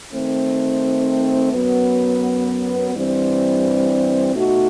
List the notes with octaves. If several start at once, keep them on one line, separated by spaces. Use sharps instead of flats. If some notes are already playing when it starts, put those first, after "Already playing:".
D#3 A3 C4
F#2 F#3 B3
G2 E3 G3 C4
B2 A3 D#4 F#4